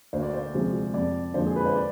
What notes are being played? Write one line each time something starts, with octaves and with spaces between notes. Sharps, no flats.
D2 C5
D5
C5
C3 F3 G#3
F2 D5
D3 F3 G#3 C5
G#4
B4
C5
D5